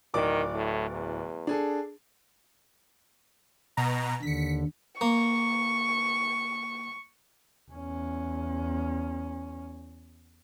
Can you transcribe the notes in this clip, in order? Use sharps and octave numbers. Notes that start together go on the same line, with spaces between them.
D1 D#3 D5 D6
A2
E2
D4 G#4 A4
B2 A#5
D#2 D3 B6 C#7
A#3 C#6
E2 C#4